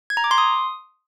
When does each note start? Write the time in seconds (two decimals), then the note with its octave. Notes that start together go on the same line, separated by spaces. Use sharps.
0.10 G#6
0.17 A#5
0.24 D6
0.31 C6
0.38 D#6